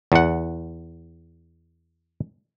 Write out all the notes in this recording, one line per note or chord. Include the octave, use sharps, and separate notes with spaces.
E2 F#5